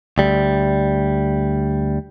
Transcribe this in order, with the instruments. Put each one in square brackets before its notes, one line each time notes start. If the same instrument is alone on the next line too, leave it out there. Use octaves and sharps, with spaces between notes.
[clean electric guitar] D2 G3